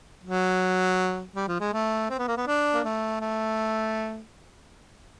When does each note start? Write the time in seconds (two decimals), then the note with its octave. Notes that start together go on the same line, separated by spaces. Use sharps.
0.24 F#3
1.36 G3
1.48 F3
1.60 G#3
1.73 A3
2.10 C4
2.18 B3
2.27 A#3
2.37 B3
2.47 D4
2.74 A#3
2.84 A3
3.21 A3